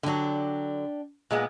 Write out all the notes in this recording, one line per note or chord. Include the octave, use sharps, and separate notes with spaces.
D3 F#3 D4 G4
A#2 G#3 B3